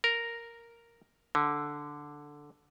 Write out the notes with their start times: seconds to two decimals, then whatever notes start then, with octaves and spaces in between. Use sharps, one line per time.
0.04 A#4
1.35 D3